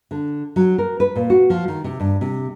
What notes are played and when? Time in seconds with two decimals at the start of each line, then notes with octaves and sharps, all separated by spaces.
0.11 D3
0.56 F#3
0.78 A#4
1.00 B4
1.16 A#2
1.30 F#4
1.50 F3
1.68 D#3
1.84 C3
2.00 G2
2.21 C3